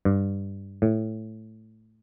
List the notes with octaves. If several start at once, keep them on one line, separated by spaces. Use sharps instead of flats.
G2
A2